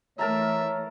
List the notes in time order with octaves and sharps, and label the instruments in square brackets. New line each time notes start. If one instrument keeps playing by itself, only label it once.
[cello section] E3 A3 [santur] A#4 A5 A#5 [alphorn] C#5 [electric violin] E5